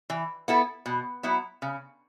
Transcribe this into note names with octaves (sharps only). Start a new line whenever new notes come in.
E3
B3 E4 A4
B2
F#3 B3 E4
C#3